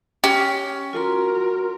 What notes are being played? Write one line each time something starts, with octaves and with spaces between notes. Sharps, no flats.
C#4 G4
F4 F#4 A#4 C6